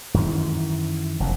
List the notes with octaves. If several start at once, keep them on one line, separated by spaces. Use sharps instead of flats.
F#2 D#3 E3
F1 F2 G#2